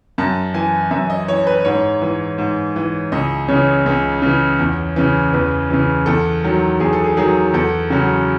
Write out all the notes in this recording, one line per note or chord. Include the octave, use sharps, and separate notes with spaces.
F#2 A5
E3 G#5
F#2 E5
D#5
E3 C#5
B4
G#2 C#5
E3
G#2
E3
C#2 D#5
C#3 E3 C#5
C#2
C#3 E3
E2
C#3 E3
E2 B4
C#3 E3
E2 A4
D#3 F#3
E2 G#4
A4
G#4
D#3 F#3 G#4
E2 A4
C#3 F#3 F#4